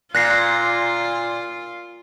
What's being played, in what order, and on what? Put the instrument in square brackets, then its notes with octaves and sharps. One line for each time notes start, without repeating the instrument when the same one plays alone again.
[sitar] A#2 [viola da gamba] F4 [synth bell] F#6 A#6 C7